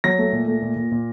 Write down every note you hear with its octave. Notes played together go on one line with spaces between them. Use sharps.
F#3 A#6
A3
A#2
A3
A#2
A#2
A#2